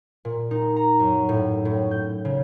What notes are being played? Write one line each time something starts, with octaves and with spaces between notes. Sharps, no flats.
A#2
D#4
A#5
F#2
A2
A2
G6
C#3